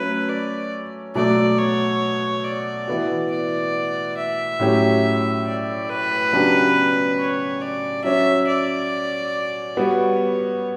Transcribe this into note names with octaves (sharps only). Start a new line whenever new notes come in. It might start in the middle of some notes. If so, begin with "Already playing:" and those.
Already playing: F#3 A3 C#4 B4
D5
B2 F#3 A3 D5
C#5
D5
E3 B3 F#4
D5
E5
A2 F#3 C#4 G4
D5
B4
C#3 F#3 B3 D4 G4
C#5
D5
F#3 C#4 F#4 E5
D5
G3 B3 F#4 C#5